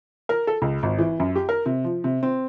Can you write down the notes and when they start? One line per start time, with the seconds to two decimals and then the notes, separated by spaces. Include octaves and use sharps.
0.29 A#4
0.47 A4
0.62 C#2
0.83 G#1
0.98 E3
1.20 F#2
1.35 G4
1.49 A#4
1.66 C3
1.84 F3
2.04 C3
2.23 C4